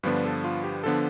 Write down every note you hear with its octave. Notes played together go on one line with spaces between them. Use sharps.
G2 D3 F3 B3 D4 B4
A4
F4
G4
D3 F3 B3 D4 A4